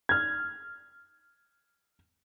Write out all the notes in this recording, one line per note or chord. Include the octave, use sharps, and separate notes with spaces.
F6 G#6